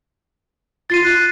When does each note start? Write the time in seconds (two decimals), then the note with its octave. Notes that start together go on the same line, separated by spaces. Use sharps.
0.90 F4 A6 C7 D#7
1.03 F#6